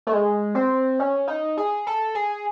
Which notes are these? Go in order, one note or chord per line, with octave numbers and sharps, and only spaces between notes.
A3
G#3
C4
C#4
D#4
G#4
A4
G#4